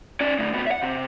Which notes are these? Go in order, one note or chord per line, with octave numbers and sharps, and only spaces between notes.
C#4 D5
A2 D3
C3 B3
E5 F#5
C3